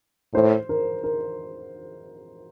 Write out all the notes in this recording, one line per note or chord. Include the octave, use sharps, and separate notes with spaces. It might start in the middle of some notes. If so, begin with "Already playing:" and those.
A2 C5
A#4
A#4